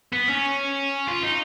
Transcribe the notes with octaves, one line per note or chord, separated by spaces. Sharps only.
B3
C#4
F4
D#4